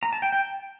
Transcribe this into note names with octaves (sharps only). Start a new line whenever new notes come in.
A#5
A5
G5
G5